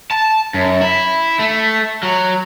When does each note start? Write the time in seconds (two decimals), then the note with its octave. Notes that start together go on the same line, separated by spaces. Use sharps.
0.11 A5
0.54 F#2
0.81 E4
1.39 A3
2.03 F#3